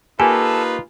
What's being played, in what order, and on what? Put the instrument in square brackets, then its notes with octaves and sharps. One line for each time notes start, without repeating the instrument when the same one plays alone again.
[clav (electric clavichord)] A#3 G4 [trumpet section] D#4 F4 B4 [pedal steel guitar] A4 [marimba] G#5